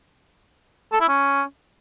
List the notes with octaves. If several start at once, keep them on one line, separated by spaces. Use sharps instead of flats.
A4
E4
C#4